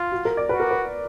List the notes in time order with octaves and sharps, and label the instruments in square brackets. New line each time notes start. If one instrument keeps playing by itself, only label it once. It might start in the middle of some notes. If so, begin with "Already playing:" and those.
Already playing: [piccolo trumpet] F4
[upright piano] F#4
A#4
D5
[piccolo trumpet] F#4 [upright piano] B4
[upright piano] A#4
B4